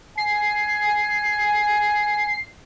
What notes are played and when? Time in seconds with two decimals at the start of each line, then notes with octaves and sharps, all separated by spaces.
0.18 G#5 C7